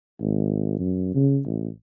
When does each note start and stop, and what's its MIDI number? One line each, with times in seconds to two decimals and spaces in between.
0.21 0.78 32
0.79 1.14 42
1.15 1.41 49
1.46 1.69 33